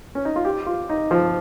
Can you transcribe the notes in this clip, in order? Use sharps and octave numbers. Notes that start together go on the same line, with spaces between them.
C#4
D#4
F4
G4
F4
D#4
F3